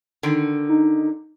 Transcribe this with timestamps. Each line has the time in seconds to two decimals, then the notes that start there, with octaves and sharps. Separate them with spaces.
0.23 D3 D#3
0.69 D#4